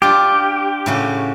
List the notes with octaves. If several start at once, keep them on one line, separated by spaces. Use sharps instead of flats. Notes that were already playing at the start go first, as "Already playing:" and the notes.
D4 F4 G4
A2 C#3 F#4